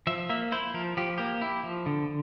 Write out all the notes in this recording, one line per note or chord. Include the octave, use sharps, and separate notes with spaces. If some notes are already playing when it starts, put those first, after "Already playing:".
F3 E5
A#3 E5
E4 C5
F3 A#4
F3 G4
A#3 G4
E4
F3
D3